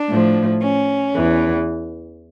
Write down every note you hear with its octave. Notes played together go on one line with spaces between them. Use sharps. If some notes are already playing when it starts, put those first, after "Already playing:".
Already playing: D4
A2 F3
C#4
E2 E3